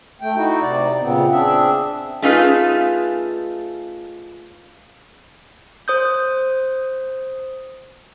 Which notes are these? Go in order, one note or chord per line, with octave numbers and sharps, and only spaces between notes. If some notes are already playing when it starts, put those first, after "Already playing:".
A3 G5
D#4 E4 F#4
C3 D5
A#2 C#3 B3 C4
C4 D4 G#4 E5
A3 C#4 D#4 F4 G#4 B4
C5 D#6 G6